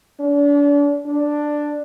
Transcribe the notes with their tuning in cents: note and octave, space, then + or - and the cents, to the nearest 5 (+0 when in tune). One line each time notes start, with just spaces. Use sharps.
D4 -35
D4 +5